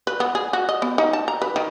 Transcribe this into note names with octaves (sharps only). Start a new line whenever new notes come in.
B4
B3
G#4
F#4
D#5
B3
D#4
A5
A#5
B4
D#3